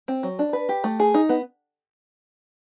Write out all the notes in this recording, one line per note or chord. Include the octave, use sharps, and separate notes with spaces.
C4
F#3
D4
B4
G4
A3
G#4
D#4
B3